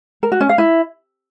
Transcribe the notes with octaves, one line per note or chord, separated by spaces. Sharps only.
A#4
F#4
C#4
F5
E4